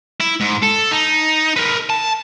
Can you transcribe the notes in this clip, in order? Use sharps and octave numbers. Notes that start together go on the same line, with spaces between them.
E4
G#2
A4
D#4
A#4 B4
A5